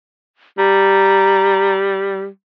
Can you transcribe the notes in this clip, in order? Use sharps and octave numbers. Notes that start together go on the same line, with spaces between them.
G3 A#5